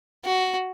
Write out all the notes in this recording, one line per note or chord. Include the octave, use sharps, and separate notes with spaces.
F#4